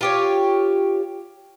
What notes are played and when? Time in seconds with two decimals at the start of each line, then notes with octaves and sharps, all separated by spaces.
0.01 F4 G4 C#5